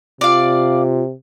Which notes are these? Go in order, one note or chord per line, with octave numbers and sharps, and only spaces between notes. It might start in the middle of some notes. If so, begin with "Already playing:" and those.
C3 F4 D5 F5